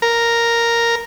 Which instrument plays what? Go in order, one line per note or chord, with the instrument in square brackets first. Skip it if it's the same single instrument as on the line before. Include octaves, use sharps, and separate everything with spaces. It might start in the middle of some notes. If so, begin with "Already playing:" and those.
[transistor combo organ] A#4